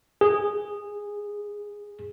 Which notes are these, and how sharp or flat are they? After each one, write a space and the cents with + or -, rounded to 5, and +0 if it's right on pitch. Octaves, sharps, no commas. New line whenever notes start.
G#4 -10